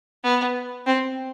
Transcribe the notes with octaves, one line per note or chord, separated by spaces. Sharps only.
B3
C4